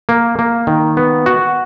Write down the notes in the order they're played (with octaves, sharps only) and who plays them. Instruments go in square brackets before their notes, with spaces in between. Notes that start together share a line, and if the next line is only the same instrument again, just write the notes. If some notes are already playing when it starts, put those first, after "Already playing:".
[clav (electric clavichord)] A#3
A#3
D#3
B3
F#4